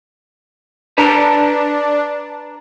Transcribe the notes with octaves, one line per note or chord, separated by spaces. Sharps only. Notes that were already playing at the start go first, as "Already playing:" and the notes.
D4 B4 A5 A#5